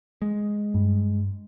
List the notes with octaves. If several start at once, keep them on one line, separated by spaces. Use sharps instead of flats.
G#3
G2